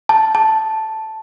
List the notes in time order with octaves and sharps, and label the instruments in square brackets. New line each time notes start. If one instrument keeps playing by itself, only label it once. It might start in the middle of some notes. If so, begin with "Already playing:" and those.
[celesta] A5
A5